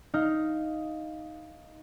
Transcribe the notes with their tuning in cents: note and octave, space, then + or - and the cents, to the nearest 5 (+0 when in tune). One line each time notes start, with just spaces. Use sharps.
D#4 +5 F5 +0